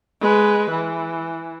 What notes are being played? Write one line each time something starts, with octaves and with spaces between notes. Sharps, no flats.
G#3 B4
E3